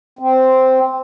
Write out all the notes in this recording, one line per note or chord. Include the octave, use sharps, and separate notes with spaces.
C4